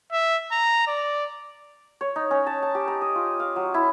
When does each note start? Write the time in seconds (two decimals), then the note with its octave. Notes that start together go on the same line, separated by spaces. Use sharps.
0.12 E5
0.52 A#5
0.87 D5
2.01 C#5
2.16 D#4
2.31 C#4
2.47 A5
2.62 A5
2.75 G4
2.88 A#5
3.02 D#5
3.15 F4
3.40 F5
3.56 F#3
3.74 E4